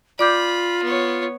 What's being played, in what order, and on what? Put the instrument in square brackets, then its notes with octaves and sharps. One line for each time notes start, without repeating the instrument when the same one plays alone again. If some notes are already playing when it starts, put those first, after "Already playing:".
[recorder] F4 [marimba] D5 D6 G6 [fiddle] B5
[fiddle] B3 C#5